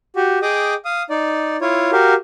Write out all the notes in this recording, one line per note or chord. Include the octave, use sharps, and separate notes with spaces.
F#4 G4
G#4 D#5 G5 D6 D#6
F5 D#6
D#4 D5
E4 F4 C#5
F#4 G4 A#4 F5